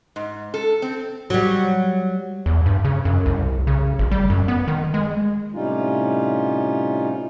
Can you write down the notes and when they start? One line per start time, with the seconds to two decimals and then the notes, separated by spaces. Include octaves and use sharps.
0.16 G#2
0.54 A4
0.82 C4
1.30 F#3 G3
2.46 E2
2.66 G2
2.85 C#3
3.05 F#2
3.26 C2
3.67 C#3
3.99 G#1
4.11 G3
4.30 F#2
4.48 B3
4.68 D#3
4.94 G#3
5.54 A2 C3 G3 C#4 D#4 F4